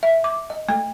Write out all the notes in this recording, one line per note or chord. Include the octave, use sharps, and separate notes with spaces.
E5
D6
D#5
A3